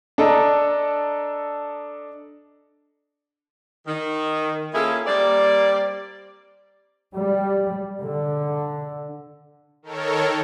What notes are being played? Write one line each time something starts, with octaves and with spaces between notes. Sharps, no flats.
D4 A4 D#5 A#5
D#3
A#3 C#4 E4 F4 G#4 A4
G3 A#3 C4 D5
G3
D3
D#3 A4 A#4 C#5